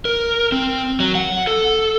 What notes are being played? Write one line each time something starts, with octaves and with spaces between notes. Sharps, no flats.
A#4
C4
F#3
F#5
A4